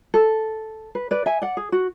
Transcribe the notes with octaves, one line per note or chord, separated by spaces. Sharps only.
A4
B4
B4 D5
E5 G#5
D5 F#5
G#4
F#4